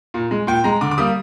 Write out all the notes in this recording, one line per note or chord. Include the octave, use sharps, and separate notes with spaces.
A#2
G#3
A#2 G5
G#3 A#5
D3 D6
D6
G3 A#3 D#6